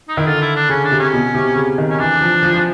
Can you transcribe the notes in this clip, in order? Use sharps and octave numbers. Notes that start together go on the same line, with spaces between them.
D#4
D#3 E4
D3 F4
E4
D4
C#3 C#4
D4
C3
C#4
B2
C3
C#3
D#3
C#4
E3 D4
F3
F3
F3